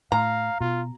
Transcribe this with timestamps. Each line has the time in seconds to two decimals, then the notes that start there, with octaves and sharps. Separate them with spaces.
0.12 A2 F5 A#5
0.61 B2 F4